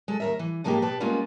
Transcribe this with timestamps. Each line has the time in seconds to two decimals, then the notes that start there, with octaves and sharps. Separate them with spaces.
0.08 G#3 A4
0.20 D#2 A#4 E5
0.39 E3
0.64 A2 F3 G#3 A#3 D#4 G4
0.82 B2 G4 B4 A5
1.00 G3 G#3 A#3 B3 C#4 F4